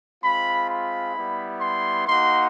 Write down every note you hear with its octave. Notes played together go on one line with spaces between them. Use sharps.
G#3 C4 F4 B5
B5
G3 B3 E4
C6
A#3 D#4 F#4 C6